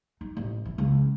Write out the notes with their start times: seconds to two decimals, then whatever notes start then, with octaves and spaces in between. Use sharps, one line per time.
0.21 D#4
0.37 A1
0.65 E3
0.78 C#2